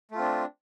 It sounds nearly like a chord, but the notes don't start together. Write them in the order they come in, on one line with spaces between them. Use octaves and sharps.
A3 F4 C4 D4